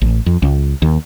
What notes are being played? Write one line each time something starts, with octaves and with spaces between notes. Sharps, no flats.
A1
F2
C#2
D#2